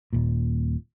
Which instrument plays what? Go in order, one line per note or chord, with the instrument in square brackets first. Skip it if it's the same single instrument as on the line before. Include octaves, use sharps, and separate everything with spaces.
[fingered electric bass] D#1 A#2